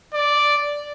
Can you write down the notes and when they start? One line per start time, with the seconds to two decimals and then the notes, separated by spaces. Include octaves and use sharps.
0.14 D5